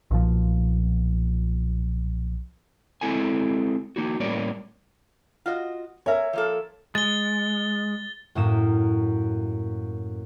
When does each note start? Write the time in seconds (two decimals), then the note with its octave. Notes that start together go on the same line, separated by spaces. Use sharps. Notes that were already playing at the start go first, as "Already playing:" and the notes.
0.11 B1 A#2 F3
3.01 G#3 C4 E4 A4 G#5
3.96 A#3 D#4 F#4
4.20 A2 G3 A#3 C#4 D5
5.46 F4 F#4 D#5
6.06 A#4 C#5 E5 G#5
6.33 F3 A#3 A4
6.95 G#3 A6 G7
8.35 F#2 A2 A#3 D#6 E7